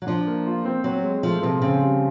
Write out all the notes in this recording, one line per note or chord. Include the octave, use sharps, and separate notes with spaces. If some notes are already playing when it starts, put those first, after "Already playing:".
F#3
F3 D4
A#3
F4
C4
F#3 C4
G#3
F3 A3
C3 F3
C#3 C4
G3